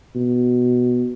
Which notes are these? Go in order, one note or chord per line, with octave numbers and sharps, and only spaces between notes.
B2